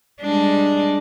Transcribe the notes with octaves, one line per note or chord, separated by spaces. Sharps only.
G3 G#3 D4